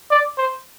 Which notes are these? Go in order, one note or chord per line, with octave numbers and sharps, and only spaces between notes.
D5
C5